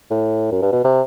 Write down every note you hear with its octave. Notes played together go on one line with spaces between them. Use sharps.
A2
F#2
G2
B2
C3